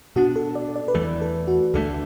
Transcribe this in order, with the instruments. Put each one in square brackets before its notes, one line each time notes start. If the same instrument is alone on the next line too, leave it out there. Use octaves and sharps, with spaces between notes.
[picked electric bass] B2 B3 D4 [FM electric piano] F#4
[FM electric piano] A4
D5
D5
B4
[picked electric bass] E2 E3 A3 [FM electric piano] A4
[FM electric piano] A4
F#4
[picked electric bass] D2 D3 F#3 A3 [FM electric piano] A4